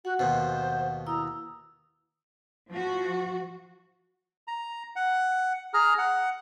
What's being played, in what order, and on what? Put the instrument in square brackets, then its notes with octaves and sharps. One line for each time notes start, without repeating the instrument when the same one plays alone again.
[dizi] F#4 [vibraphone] F#5
[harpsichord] D#2 B2 [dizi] C5
[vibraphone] E4 D#6 E6 [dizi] A#5
[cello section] F3 F#4
[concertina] A#5
F#5
G#4 A#5 F6
F#5